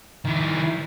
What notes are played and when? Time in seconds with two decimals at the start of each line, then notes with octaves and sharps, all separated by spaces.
0.25 D#3 E4